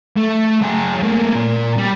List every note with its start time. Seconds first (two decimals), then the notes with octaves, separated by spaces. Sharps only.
0.16 A3
0.62 F#3 G#4
1.03 A3 A#3
1.33 A#2 A#3
1.78 G3